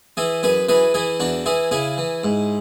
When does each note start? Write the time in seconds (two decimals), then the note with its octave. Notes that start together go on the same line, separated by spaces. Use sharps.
0.17 E3 E4 G#4
0.43 F#2 G#4 B4
0.69 E3 G#4 B4
0.94 E3 E4 G#4
1.20 E2 D4 F#4
1.46 E3 E4 G#4
1.71 C#3 E4 G#4
1.98 E3
2.24 G#2